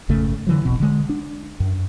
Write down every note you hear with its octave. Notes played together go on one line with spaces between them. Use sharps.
G#1 F2 C#3 A3
D3 E3 F#3
D#1 A#1 B2 C4
D3 G#3
D4
F#2